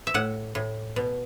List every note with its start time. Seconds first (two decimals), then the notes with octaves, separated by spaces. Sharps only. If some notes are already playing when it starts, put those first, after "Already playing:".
0.07 E5
0.14 A2 F#5
0.55 A2
0.96 B2